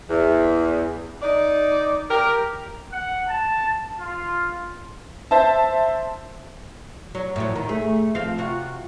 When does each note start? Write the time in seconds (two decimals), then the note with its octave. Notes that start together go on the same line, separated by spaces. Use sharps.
0.09 E2
1.22 D#4 D5
2.11 G4 A#4
2.93 F#5
3.29 A5
3.99 F4
5.31 C5 E5 A5
7.15 F#3
7.36 A2 F3 F#3
7.56 D#3
7.69 A3 G#4
8.15 F3 C4 F5
8.38 C3 F4 F#4